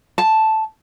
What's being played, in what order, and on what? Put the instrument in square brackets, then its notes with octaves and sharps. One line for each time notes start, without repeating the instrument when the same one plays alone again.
[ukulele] A5